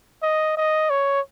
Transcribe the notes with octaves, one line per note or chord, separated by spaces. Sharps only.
D#5
D#5
C#5